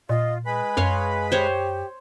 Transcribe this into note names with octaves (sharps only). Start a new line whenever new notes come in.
A#2 F4 D#5
G#3 B4 G#5 B5
F#2 C#5 F5 C6
G4 C5 C#5